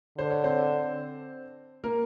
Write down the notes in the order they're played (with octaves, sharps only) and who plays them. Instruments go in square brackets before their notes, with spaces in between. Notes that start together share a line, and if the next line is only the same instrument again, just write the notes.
[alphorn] D3 [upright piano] C5
[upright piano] C#5
C4 C5
A#3 A#4